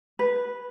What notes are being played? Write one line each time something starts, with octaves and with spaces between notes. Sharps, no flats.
B4